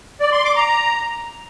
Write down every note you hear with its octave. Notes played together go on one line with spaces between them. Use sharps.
D5
C6
D6
A#5